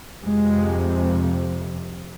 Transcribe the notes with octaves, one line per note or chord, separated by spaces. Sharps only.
F2 C3 G#3